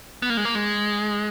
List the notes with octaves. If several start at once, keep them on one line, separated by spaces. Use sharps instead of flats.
B3
A#3
G#3
A#3
G#3